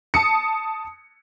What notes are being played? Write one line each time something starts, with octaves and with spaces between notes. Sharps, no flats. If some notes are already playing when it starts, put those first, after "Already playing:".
A5 D#6 C#7